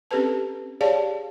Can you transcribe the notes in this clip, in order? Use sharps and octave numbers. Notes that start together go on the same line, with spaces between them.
C4 C#4 G4 A4 B4 A5
G4 G#4 C#5 D5 F5 A5